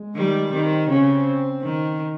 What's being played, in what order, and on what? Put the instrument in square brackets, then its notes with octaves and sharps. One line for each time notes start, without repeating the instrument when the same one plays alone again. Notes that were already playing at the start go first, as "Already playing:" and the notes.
Already playing: [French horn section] G#3
[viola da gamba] D#3 G3
[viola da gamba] D#3 [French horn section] C4
[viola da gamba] C#3 [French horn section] C4
[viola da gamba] D#3